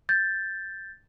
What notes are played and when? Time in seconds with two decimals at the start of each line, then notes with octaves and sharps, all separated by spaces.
0.09 G6 A6